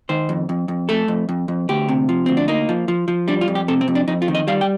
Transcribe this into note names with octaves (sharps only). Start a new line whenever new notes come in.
D#3 C5
F2
F2
F2
A3 A4
F2
F2
F2
D2 G4
C3
F3
D2 C4
D4
A#3 D#4
F3
F3
F3
G3 D4
F4
F2
G4
C3 A4
C4
F2
D4
F2 D#4
F4
D#3
D#5
G3 F5
G5